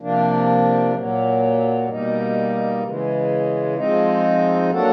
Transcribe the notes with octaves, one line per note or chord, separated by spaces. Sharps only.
C3 F3 A#3 D4
A#2 F#3 A#3
B2 G3 A#3 D#4
C#3 E3 G#3
F3 G#3 C4 D#4
F#3 A#3 D4 F#4 A4